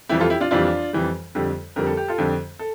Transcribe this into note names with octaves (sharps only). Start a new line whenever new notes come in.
F2 E3 G3 E4 G4
F4 A4
E4 G4
D4 F4
F2 E3 G3 D4 F4
F2 E3 G3
F2 D3 G3
F2 D3 G3 A#4
A4
G4
F4 A4
F2 D3 G3
A4